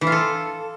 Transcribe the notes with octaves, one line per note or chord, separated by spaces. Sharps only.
E3
F4
A4